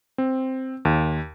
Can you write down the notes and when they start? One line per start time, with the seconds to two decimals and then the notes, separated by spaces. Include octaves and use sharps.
0.18 C4
0.85 D#2